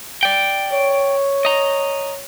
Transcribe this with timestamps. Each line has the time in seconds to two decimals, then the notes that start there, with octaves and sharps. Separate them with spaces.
0.23 D5 G5
0.72 C#5
1.45 D#5 A#5